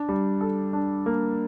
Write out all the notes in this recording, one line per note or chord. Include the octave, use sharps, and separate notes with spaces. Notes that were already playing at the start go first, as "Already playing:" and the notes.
Already playing: D4
G3
A4
D4
A#3